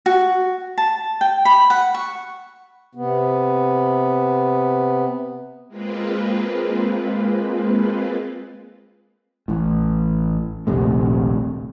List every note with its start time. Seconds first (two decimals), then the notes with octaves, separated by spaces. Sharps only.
0.06 F#4
0.78 A5
1.21 G5
1.45 B5
1.70 F#5
1.94 C#6
2.95 C3 B3
5.68 G#3 A#3 C4 F4 B4
9.48 A1 A2
10.67 D#1 A#1 C3 A3